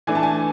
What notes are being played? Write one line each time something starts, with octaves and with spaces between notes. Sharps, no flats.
E3 A3 D4 G#5
A5
G#5